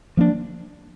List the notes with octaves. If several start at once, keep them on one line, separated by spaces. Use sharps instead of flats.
F3 A#3 D4